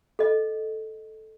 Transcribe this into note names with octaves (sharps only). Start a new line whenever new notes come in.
A4 D#5